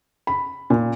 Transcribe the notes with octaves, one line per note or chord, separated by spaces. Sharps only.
B5
A#2